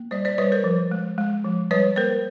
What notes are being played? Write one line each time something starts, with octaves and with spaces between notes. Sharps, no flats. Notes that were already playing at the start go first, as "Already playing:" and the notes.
Already playing: A#3
G3 C5 D5
C5 D5
G3 B4 C#5
A#4 C5
F3
G#3
G#3
F3
G3 B4 C#5
A#3 A#4 C5